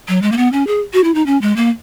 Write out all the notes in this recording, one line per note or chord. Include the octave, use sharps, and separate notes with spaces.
F#3
G#3
A#3
B3
C#4
G#4
F#4
E4
D#4
C#4
G#3
A#3